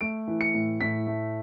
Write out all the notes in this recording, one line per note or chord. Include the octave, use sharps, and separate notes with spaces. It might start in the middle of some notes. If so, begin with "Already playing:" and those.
A3 D7
E3
C#7
A2
A2 B6
A3